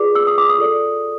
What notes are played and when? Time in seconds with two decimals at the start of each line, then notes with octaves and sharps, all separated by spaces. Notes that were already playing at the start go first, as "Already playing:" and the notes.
Already playing: F4 G#4 B4 D5 D6
0.15 E6
0.27 D#6
0.38 D6
0.49 D#6
0.58 F4 A4 D5